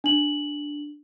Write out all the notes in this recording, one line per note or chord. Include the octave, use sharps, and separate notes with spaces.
D4 F#7